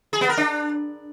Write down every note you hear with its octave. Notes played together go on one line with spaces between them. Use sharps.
G#4
B3
A#4
D4